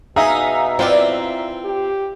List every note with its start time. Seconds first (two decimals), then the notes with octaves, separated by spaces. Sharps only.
0.16 B2 D#4 G#4 E5 F5 A#5
0.79 C4 E4 F4 B4 D5
1.64 G4